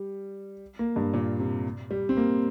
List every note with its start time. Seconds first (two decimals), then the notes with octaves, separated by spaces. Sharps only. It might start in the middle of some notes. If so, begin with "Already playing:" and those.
Already playing: G3
0.79 A#3
0.96 G2
1.14 A#2
1.39 C3
1.91 G3
2.09 C4
2.17 A#3